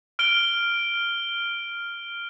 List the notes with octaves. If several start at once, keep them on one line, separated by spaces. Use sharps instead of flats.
F6 D7 G7